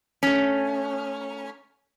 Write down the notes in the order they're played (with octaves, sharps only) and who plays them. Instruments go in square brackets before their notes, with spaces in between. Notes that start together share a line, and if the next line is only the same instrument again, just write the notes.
[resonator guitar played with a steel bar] A3 C#4